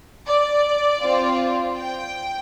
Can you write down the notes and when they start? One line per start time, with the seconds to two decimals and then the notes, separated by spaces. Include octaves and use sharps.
0.26 D5
1.01 C4 F4
1.76 G5